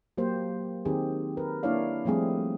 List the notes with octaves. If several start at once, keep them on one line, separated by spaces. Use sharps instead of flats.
F#3 A#3 G4 C5
D#3 C4 D#4 G4 G#4
A#4 B4
A#3 D4 E4 C#5 D5 F5
F3 G3 A3 C4 G#4